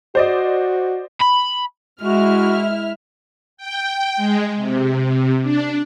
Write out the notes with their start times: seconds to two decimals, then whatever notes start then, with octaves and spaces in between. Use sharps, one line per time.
0.15 F#4 C5 D5 D#5
1.21 B5
2.02 G#3 E4 F#4 E5 F6
3.57 G5
4.16 G#3
4.56 C3
5.43 D4